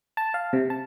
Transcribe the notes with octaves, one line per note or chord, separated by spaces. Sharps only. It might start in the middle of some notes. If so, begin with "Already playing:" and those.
A5
F5
C3
A5